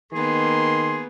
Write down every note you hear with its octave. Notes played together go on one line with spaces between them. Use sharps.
D#3 A#3 B3 G#4 C6